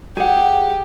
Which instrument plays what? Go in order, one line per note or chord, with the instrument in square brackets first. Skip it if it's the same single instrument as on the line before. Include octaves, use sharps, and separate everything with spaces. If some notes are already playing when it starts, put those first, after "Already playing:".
[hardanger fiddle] G4 [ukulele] G#4 F#5